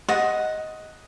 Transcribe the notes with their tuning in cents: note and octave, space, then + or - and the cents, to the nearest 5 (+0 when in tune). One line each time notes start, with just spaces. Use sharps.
D#5 +10 F#5 +0